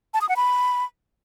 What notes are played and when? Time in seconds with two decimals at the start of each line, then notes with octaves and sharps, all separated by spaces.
0.14 A5
0.21 D#6
0.29 F#5
0.36 B5